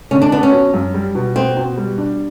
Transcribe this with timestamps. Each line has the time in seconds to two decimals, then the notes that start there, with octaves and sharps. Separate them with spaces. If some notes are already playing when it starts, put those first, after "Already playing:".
0.11 D3 C#4
0.22 D4
0.32 B3 D4
0.43 C#4
0.52 F#3
0.74 F#2
0.94 G3
1.15 B2
1.36 B3 C4
1.57 B2
1.77 G3
1.98 D4